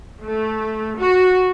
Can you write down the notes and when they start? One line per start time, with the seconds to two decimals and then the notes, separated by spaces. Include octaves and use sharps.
0.24 A3
0.98 F#4